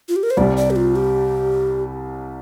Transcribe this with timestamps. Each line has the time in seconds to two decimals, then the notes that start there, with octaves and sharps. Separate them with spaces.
0.09 F4
0.16 G4
0.23 A#4
0.30 C5
0.37 C2 C3 G3 D5
0.57 D5
0.70 G4
0.76 F4
0.96 G4